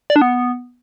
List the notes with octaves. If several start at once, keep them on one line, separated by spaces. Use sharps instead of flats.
D5
D4
B3